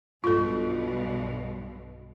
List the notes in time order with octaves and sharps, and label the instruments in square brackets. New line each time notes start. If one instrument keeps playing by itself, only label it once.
[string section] B1 G2 B2 [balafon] F4 A4